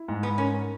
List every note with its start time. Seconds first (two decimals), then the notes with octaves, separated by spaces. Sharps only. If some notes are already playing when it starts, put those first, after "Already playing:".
Already playing: E4
0.08 G#2
0.23 B3
0.38 C#4 A#4